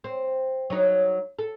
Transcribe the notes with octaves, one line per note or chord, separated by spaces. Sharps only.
C4
F#3 D#4
A4